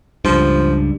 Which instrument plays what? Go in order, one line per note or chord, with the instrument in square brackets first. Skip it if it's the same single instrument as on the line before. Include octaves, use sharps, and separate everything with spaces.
[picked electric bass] C#2 G2 [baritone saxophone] F3